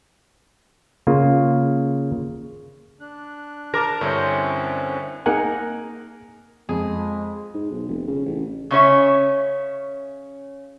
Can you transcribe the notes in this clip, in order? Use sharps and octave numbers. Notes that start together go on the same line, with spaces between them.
C#3 A#3 F4
D4 F#6
A#4 A5 D6 A#6
G2 D3 C4 C#4 E4 C5 F#6
A#3 D#4 G#4 A#4 F#5 G#5
F2 G#3 G#4
G#2
B1
F1
C#3
A1
C#3 C#4 C#5 E5